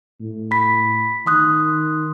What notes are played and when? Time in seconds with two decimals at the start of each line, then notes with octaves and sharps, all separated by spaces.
0.21 A2
0.51 B5 B6
1.26 D#3 C6 D#6 F#6